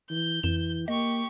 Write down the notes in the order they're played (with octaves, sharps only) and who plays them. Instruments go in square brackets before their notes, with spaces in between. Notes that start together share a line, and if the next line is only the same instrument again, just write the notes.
[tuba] E3 [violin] G6
[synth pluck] F2 E7 [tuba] E3
[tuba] A#3 [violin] G4 C#6 [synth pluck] D#5